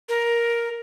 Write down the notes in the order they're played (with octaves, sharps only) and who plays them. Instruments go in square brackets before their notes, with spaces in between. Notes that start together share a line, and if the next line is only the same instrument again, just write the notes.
[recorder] A#4